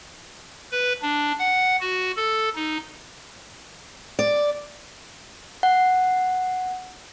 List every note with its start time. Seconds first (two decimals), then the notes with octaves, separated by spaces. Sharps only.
0.72 B4
1.02 D4
1.39 F#5
1.80 F#4
2.17 A4
2.55 D#4
4.19 D5
5.63 F#5